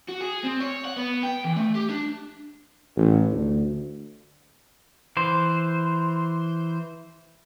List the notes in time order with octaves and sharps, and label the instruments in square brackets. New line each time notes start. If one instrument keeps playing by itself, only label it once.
[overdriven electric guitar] F#4
G#4
C4
C#5
F#5
B3
G5
E3
A3
G4
D4
[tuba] A1
D2
[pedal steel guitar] E3 C5